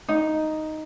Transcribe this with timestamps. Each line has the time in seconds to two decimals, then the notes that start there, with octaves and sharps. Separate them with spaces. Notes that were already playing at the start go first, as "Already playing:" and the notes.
0.08 D#4